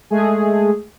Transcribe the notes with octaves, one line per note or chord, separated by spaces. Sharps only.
G#3 A3 G#4